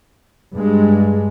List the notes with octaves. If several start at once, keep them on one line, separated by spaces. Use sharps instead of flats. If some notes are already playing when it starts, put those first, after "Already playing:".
G2 G#3